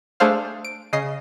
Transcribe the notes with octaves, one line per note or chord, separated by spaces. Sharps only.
A3 D4 G#4 A4 C5 F5
D7
C#3 D#5 C7